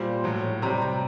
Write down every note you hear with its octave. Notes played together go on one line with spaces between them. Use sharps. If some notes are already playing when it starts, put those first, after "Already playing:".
Already playing: A#2 G3 C5
A2 F#3
C3 G3 A#5
A#5